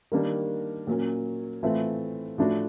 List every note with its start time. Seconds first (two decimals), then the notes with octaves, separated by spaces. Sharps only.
0.12 D#3 G3 A#3 D4
0.87 A#2 F#3 A#3 C#4
1.63 A2 E3 A3 C4 F4
2.38 A2 F3 A3 D4 F#4